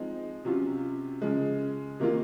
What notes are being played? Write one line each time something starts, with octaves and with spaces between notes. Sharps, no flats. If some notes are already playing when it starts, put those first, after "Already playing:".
Already playing: F3 G#3 C4 D#4
C3 F#3 C#4 F4
C#3 F3 G#3
C3 D#3 A#3 F4